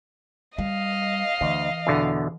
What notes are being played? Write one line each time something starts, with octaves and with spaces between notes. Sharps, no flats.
G3 D#5 F5
D2 E3
E2 B2 D3